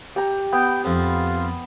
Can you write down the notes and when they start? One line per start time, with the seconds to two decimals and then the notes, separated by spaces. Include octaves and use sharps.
0.16 G4 G5 A#5
0.52 B3 G5
0.85 F2 F4